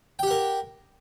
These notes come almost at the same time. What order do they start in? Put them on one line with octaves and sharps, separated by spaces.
G5 G4 F#5 A#4